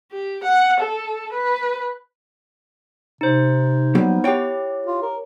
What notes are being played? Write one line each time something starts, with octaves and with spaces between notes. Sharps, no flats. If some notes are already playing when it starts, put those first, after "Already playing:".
G4
F#5
A4
B4
C3 D#4 C5
F#3 G3 A#3 B3
E4 G4 C#5 G5
F4
A#4